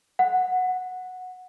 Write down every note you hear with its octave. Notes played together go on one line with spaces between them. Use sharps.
F#5